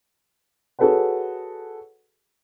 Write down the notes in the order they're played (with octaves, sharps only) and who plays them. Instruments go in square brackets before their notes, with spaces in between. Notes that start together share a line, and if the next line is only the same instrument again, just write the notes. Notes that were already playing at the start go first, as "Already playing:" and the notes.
[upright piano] F#4 G#4 A4 B4 C#5 F#5